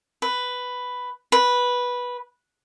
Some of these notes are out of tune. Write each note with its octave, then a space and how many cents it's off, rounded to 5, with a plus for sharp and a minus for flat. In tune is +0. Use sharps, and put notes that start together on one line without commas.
B4 +5
B4 -10